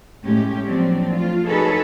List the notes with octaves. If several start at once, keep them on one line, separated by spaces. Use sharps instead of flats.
A2 G#3 C#4 G4
F3 F#3 A#3 C4 D4
A3 F4
D#4 F#4 G#4 A4 B4 C#5